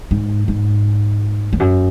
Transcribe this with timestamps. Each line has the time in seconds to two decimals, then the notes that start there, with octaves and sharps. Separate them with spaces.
0.11 G#2
0.48 G#2
1.53 E2
1.60 F#2